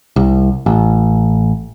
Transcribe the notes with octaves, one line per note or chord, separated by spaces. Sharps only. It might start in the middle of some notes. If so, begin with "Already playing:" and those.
C2
A1